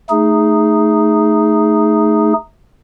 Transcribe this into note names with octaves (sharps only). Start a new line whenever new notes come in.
A3 D#4 G#4